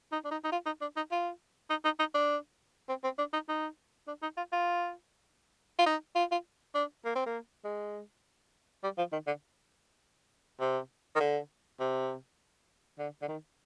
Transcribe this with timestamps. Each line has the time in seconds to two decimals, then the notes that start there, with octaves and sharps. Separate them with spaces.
0.12 D#4
0.25 D4
0.31 D#4
0.44 D#4
0.52 F4
0.66 D#4
0.81 D4
0.97 D#4
1.11 F4
1.70 D#4
1.84 D#4
1.99 D#4
2.14 D4
2.89 C4
3.04 C4
3.18 D4
3.33 D#4
3.49 D#4
4.07 D4
4.22 D#4
4.37 F4
4.52 F4
5.78 F4
5.87 D#4
6.15 F4
6.32 F4
6.75 D4
7.05 A#3
7.15 C4
7.26 A#3
7.64 G#3
8.83 G3
8.98 F3
9.12 D#3
9.27 D3
10.60 C3
11.15 D#3
11.20 D3
11.80 C3
12.98 D3
13.22 D3
13.28 D#3